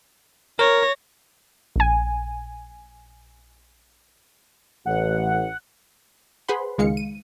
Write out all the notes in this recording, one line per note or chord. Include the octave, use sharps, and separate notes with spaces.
A#4 C#5 A#6
A#1 G#5
A1 F#5
G#4 B4 C5 F#5 B5 C6
C#2 D#3 G#3 F5 C#7
D#7